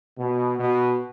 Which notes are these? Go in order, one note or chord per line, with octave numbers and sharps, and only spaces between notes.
B2
B2